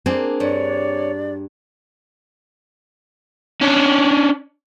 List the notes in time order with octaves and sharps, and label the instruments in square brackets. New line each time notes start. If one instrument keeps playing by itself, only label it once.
[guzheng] A#3 D4 G#4 [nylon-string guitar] C4
[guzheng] G2 [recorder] C#5 [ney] D5
[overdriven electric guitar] C#4 D4